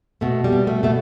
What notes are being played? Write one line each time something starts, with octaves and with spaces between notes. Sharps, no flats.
B2 A3
G3
B2
A3
B2 A3